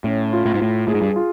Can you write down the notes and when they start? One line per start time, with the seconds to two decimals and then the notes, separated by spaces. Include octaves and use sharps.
0.04 A2 C#4
0.33 F4
0.46 A2
0.54 G#2
0.60 A2 F4
0.88 A2 G#4
0.94 G#2
1.02 G2
1.16 F4